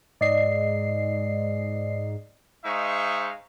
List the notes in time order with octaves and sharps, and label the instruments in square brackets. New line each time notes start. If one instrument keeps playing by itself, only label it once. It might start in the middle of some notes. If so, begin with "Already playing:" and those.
[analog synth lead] G#2 [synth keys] D5 D#5 C7
[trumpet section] G#3 D#4 C5 E5 F5 C#6